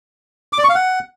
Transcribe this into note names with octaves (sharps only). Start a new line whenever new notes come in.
D6
D5
C#6
F5
F#5